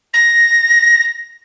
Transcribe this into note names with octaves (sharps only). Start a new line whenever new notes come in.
A#6